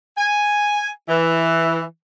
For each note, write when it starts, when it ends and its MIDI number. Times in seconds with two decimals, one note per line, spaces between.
0.18 0.89 80
1.09 1.82 52